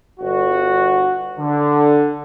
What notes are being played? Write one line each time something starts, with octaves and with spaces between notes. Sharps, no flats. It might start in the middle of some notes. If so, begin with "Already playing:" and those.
G1 F#4
D3